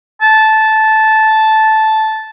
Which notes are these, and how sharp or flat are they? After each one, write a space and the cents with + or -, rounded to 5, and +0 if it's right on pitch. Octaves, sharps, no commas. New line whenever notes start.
A5 -10